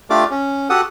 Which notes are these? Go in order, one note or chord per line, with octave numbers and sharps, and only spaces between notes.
A3 D4 F4 G4 D5 D6
C#4
F#4 G4 A4 F#5 D#6